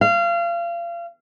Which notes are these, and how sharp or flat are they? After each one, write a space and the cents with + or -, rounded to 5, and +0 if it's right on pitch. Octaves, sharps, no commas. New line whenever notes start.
F5 -30